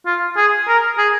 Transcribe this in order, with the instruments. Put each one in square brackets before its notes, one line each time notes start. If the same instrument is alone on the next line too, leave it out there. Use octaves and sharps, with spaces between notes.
[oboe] F4
G#4
A#4
G#4